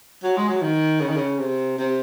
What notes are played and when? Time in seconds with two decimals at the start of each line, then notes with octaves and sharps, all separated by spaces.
0.23 F#3
0.37 G#3
0.49 F#3
0.62 D#3
1.01 C#3
1.09 D#3
1.16 C#3
1.39 C3
1.78 C3